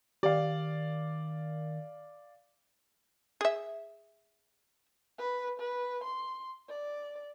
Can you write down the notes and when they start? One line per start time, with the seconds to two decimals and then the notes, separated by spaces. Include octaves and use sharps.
0.23 D#3 G4 D5 F5
3.41 G#4 E5
5.18 B4
5.59 B4
6.04 C6
6.69 D5